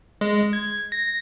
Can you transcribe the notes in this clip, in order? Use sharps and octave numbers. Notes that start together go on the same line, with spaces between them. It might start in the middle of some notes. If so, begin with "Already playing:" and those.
G#3
G#6
A#6